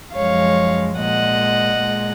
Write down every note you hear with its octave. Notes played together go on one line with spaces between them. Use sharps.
F#2 F3 G#3 C#5 F5
A#2 G#3 D#5 F#5
A#2 G#3